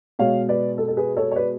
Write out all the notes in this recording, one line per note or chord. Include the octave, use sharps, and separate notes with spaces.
B2 G#3 C#5 F5
B4 D5
A4
A4
G#4 B4
A4 C#5
C#5
B4 D5